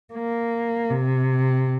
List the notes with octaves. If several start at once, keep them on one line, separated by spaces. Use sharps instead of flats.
A#3
C3